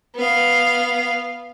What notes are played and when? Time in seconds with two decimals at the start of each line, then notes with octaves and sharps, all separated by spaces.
0.15 B3 F5